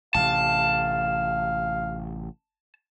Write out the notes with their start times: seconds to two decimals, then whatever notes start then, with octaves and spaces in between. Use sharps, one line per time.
0.15 A1 C3 A3 F5 A5